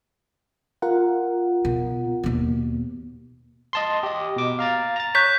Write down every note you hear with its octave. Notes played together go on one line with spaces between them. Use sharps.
F4 A#4 F#5
B2
D#2 B2
D#5 A5 C6
G4 D#5
B2 D6
F5 A#5 A6
A#5 A6
C#5 F#6 G6 B6